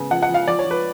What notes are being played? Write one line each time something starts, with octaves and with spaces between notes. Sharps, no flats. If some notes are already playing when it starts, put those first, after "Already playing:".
Already playing: C#3 B3
F3 F#5
F#5
F3
F5
F3 D5
C#5
F3
B4